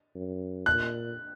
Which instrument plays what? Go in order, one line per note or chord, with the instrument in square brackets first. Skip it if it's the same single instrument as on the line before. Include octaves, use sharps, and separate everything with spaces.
[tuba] F#2
[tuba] A#2 [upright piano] F#6